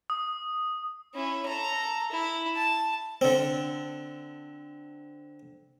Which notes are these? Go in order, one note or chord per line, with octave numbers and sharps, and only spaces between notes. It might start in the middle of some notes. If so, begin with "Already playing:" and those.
D#6
C#4 E4
A4 A#5
E4
A5
D3 C4